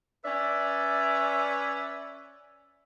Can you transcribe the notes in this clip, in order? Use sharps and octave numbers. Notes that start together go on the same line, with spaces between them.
C#4 B4 D5 E5